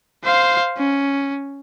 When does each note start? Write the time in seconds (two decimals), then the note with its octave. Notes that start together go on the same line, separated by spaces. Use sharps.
0.24 C5 F5
0.78 C#4